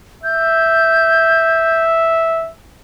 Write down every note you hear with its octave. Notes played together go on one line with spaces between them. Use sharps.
E5 G6